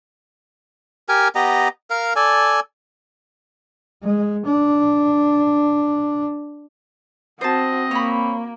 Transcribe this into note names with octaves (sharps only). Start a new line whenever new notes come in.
G4 A#4 G#5
B3 G4 D#5 A#5
A#4 F5
A4 D5 G#5
G#3
D4
C4 F#4 C5 D#5 A5
A#3 C#5 B5